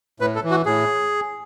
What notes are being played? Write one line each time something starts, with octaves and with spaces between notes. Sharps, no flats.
A2 B4
A4
E3
F#4
A2 G#4